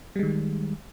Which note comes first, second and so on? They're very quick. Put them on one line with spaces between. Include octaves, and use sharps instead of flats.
G3 G#3 D#3